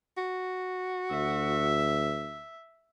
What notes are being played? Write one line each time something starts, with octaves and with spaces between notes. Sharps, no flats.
F#4
D2 E5